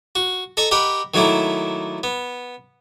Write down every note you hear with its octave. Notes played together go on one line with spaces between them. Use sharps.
F#4
A4 D#5 A#5 C#6
G4 A#4 D#5 F#5 B5
D#3 F#3 A3 A#3 E4
B3